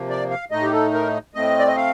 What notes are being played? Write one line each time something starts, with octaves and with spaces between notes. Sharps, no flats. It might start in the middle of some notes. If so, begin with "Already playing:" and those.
Already playing: C3 F3 A#3
D5
F5
A2 A3 D#4 D#5
G4
A4
A#4
A2 A3 C4 D#5
D5
D#5
F5